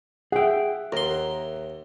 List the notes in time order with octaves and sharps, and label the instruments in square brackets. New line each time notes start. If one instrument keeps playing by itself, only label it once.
[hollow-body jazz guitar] G#4 G5 [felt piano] E5 F#5
[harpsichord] D#2 C6 [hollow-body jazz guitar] A#4